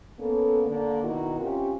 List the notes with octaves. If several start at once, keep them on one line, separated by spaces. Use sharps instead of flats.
A#3 B3 C#4 A4
D3 A#3 D5
B2 D#3 D#4 E4 F#4 A#4
C3 C#4 F4 G4